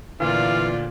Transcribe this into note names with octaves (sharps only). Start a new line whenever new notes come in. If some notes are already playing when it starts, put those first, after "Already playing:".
D2 A#2 E3 F4 D5 F5